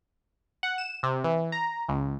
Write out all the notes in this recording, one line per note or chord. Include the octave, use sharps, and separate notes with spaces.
F#5
E7
C3
E3
A#5
C#2